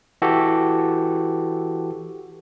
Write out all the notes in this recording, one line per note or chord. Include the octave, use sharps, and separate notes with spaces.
E3 F#4 G4 A4